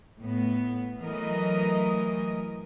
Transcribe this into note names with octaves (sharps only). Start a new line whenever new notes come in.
A2 B3
E3 F#3 A3 A#4 D#5